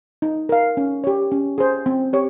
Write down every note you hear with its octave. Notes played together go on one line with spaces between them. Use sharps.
D#4
A#4 F5
C#4
G4 C#5
C#4
G#4 C5
C4
G4 C#5